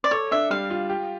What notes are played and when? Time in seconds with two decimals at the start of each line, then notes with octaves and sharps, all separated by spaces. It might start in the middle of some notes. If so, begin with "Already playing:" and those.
0.04 D5
0.11 A4 C#5
0.31 D4 E5
0.50 G3 F5
0.70 F4
0.90 G4